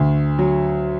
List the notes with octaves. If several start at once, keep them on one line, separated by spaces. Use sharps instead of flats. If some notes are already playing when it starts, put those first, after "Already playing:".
Already playing: D2
F#3